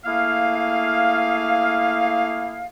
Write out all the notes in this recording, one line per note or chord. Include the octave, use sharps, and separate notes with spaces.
A3 A#3 E4 G#4 F5